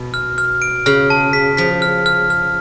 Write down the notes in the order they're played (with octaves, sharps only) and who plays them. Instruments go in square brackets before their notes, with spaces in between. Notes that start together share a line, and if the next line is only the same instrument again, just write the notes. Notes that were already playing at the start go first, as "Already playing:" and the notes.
Already playing: [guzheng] B2
[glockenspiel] F6
F6
D7
[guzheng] C#3 [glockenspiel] F6
[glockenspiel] A5
B6
[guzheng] F3 [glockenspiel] B6
[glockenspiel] F6
F6
F6